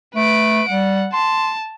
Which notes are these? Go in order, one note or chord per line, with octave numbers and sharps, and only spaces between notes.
A3 B4 D7
G3 F#5
A5 C6